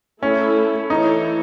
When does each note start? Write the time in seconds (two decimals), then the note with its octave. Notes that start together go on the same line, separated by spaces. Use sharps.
0.22 A3 C#4 E4 A4
0.90 E3 A3 D#4 E4 A4 C#5